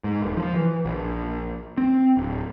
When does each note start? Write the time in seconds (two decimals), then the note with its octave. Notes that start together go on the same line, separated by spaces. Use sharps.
0.04 G#2
0.22 D#1
0.37 F3
0.55 E3
0.85 A#1
1.78 C4
2.17 D1